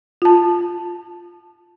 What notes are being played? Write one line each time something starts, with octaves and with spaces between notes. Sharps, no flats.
F4 A5